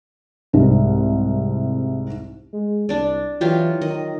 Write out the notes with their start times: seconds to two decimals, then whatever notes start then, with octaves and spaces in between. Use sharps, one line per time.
0.53 C2 G#2
2.53 G#3
2.89 C2 D4 D5
3.41 E3 F#3 F4 G4
3.82 D#3 D#5